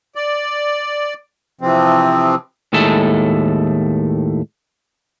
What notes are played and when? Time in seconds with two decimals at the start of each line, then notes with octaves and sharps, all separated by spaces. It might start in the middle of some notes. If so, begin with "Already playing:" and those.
0.15 D5
1.61 C3 E3 F3 C4
2.73 D#2 A2 G#3 A3 A4